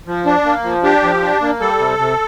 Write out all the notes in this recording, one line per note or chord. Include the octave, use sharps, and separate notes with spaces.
F3
D4
A#3
F3
D4 G4
F3
D4
A#3
G3 A4
C3
C3